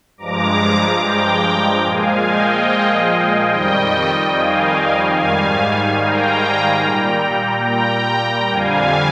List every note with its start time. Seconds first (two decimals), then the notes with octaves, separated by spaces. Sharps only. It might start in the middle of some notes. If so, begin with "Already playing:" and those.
0.18 G2 F3 G#3 A#5 D6
1.01 G5 A#5
1.84 A#2 F3 G#3 F5 G#5
2.26 D#5 G5
3.51 F2 D#3 G3 D#5 G5
4.34 F5 G#5
5.17 G#2 D#3 G3 F5 G#5
6.00 G5 A#5
6.84 A#2 G3
7.67 G5 A#5
8.50 F2 D3 G3 F5 G#5